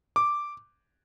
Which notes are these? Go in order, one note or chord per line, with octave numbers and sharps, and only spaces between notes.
D6